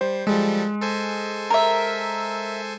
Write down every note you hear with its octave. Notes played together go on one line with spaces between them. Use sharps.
G3 C5
F3 G3 G#3 A4
A4 C5 G#5
A#4 E5